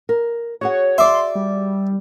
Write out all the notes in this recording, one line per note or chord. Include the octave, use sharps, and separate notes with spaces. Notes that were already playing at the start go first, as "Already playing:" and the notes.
A#4
F#4 G#4 C#5 F#5
D5 E5 C6
G3